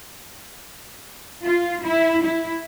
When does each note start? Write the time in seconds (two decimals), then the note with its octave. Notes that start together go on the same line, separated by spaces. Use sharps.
1.44 F4
1.84 E4
2.23 E4